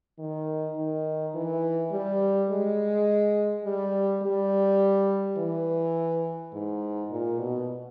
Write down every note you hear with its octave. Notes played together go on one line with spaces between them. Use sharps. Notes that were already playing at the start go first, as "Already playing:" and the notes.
D#3
D#3
E3
G3
G#3
G3
G3
E3
G#2
A#2
B2